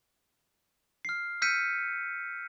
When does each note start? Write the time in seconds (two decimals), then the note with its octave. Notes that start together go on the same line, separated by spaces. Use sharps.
1.05 F6 C7
1.42 E6 F6 G6 B6 C#7 D#7